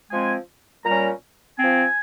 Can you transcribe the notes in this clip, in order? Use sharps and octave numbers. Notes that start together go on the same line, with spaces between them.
F3 G#3 C4 G#5
A#2 G3 C#4 A#5
F3 C4 G#5